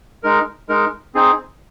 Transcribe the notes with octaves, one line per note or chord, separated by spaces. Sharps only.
G#3 D#4 A#4
G#3 D#4 A#4
C4 D#4 G#4 C5